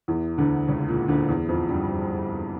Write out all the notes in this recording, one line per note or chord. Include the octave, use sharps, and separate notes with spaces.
E2 E3
D2 D3
C#2 C#3
A#2
D2 D3
E2 E3
F2 F3
G2 G3